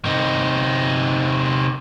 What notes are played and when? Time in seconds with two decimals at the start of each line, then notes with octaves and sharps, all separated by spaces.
0.05 C3 D#4